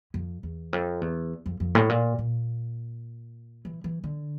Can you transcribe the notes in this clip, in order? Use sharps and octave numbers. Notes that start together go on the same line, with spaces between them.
F2
E2
F2
E2
F2
F2
A2
A#2
A#2
E3
E3
D3